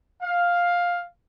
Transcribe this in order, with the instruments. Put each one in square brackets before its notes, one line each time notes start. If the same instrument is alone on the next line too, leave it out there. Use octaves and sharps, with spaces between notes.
[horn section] F5